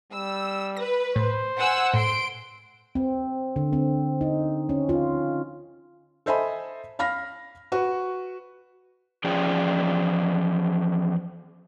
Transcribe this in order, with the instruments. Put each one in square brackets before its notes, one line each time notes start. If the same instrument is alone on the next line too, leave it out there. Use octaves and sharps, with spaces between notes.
[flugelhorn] G3 [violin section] E6
[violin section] B4 [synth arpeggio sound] A#6
[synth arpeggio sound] A2 [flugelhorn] C5
[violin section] F#5 G#5 E6
[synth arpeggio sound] A2 [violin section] C6 D7
[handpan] C4
D3
C4
D#4
C#4
F4
[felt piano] A4 C5 D#5 E5 G#5 B5
F5 B5 F6 A#6
F#4 B4 C#6
[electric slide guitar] E2 F3 C#4 G#4 D5 G5